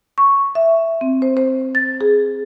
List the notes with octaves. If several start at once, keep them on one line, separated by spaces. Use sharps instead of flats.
C#6
E5
C4
C5
C5
A6
G#4